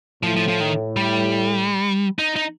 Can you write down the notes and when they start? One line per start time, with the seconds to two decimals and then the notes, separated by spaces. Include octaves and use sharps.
0.23 A2 F3
0.36 F3
0.48 F3
0.60 D#3
0.97 G3
2.19 D#4
2.36 D#4